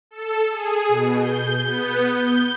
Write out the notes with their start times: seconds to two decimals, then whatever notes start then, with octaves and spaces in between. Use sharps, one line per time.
0.11 A4
0.50 G#4
0.88 B2
1.20 G6
1.63 B3
2.14 G6